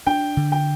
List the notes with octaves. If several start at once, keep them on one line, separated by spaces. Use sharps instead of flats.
D4 G5
D3
G5